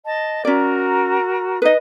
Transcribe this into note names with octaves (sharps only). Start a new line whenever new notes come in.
D#5 A5
C#4 F#4 A#4 D5 A#5
D#4 B4 D#5